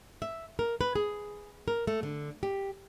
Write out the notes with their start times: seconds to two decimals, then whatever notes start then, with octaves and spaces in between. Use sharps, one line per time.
0.22 E5
0.59 A#4
0.81 B4
0.95 G#4
1.68 A#4
1.87 A3
2.03 D3
2.43 G4